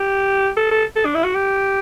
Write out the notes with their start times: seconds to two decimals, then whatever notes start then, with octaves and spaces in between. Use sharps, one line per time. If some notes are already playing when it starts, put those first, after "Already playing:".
Already playing: G4
0.57 A4
0.71 A4
0.96 A4
1.05 D4
1.15 E4
1.24 F#4
1.34 G4